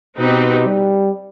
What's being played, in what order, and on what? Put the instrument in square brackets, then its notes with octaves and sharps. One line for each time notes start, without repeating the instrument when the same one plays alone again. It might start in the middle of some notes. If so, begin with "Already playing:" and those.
[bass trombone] B2 [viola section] C4 D#4 G4 B4
[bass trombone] G3